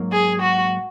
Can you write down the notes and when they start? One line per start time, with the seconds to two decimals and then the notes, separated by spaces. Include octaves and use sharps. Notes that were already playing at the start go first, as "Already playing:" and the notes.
Already playing: G#2 F#3 A#3
0.12 G#4
0.41 F#4